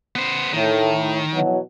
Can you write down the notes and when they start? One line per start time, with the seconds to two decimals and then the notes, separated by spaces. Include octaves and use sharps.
0.15 B3 C5
0.53 A2 D#3
1.32 B2 E3 F#3